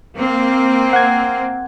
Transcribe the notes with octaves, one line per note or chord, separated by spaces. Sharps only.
A#3 C4
F#5 G#6